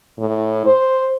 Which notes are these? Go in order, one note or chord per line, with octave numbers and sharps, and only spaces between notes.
A2
C5